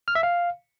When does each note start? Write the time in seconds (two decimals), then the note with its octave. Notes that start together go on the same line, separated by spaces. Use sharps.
0.08 F6
0.15 E5
0.23 F5